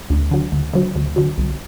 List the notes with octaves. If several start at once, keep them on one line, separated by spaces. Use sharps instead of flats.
D2
D3 F#3
D2
D3 F#3
D2
D3 F#3
C2